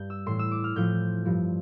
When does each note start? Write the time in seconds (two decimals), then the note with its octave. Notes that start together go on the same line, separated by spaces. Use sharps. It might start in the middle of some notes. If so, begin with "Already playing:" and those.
Already playing: G2 G6
0.10 E6
0.26 A2 E3 C6
0.39 E6
0.51 D6
0.64 F6
0.76 A2 F3 G6
1.25 G2 F3